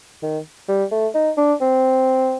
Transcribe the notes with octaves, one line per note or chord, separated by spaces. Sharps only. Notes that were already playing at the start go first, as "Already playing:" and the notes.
D#3
G3
A3
D#4
D4
C4